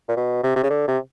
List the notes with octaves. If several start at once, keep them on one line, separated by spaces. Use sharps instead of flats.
A#2
B2
C3
C3
C#3
D3
C3